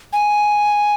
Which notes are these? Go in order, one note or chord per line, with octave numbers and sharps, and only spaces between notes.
G#5